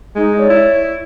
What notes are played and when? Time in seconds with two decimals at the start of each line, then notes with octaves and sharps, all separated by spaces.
0.16 G#3 D#4
0.37 C#5 D5
0.50 E4